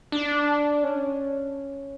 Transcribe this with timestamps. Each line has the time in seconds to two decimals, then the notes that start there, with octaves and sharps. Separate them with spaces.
0.12 D4
0.83 C#4